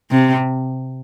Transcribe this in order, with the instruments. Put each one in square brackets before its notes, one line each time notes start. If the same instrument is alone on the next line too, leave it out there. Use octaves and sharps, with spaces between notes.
[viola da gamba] C3